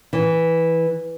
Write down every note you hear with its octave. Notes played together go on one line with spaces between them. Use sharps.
E3